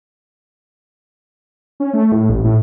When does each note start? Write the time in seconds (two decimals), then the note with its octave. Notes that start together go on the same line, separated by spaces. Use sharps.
1.80 C#4
1.93 A3
2.12 A2
2.29 A1
2.44 A2